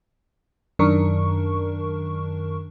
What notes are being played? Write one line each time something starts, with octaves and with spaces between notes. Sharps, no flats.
F#2 D#3 D4 A#4 C#6